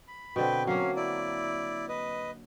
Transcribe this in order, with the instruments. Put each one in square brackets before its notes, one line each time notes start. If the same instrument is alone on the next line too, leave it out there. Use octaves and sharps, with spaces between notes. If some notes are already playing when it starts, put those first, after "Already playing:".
[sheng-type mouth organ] B5
[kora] B2 D3 C4 [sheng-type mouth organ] B4 G5
[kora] F#3 A#3 [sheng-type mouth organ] C#4 F5
[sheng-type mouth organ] E4 D5
B4 D#5